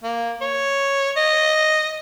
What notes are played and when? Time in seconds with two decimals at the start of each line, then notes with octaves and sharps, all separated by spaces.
0.03 A#3
0.41 C#5
1.16 D#5